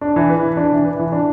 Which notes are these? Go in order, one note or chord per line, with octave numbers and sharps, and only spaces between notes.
D4
E3
B4
E3
D4
E3
B4
E3
D4